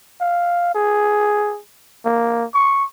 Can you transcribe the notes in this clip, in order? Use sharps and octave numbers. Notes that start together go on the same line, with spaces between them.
F5
G#4
A#3
C#6